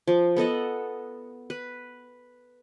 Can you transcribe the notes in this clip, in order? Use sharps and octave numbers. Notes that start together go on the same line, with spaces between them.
F3
B3 A4 D#5 F#5
B4